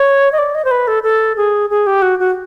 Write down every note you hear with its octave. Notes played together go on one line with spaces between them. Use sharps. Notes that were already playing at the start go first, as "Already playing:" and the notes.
Already playing: C#5
D#5
D5
D#5
C5
B4
A4
A4
G#4
G#4
G4
F#4
F#4